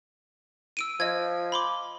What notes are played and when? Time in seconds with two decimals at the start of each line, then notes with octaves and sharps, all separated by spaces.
0.77 E6 D7 D#7
1.00 F3 D#5 G#6
1.52 B5 C6 D6